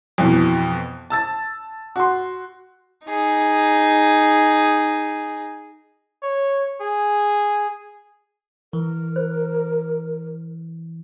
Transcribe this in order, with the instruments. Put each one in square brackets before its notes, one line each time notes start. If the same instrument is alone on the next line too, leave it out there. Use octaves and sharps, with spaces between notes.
[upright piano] F2 B2 E3
A5 E6 A6
F#4 C6
[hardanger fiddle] D#4 G#4
[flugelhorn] C#5
G#4
[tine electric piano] E3 [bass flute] A#4
[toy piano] C5